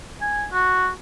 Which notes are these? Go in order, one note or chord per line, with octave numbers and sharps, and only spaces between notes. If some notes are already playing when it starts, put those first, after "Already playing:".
G#5
F#4